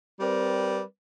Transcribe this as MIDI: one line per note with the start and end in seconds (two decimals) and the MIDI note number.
0.20 0.81 55
0.20 0.81 60
0.20 0.81 70
0.20 0.81 71
0.20 0.81 74